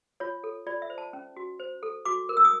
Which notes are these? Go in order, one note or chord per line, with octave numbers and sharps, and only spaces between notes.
F4 C#5
A4
F4 D5
E5
C5
A5
C#4
F#4
C5
A4
F#4 D6
A#4
E6
D#6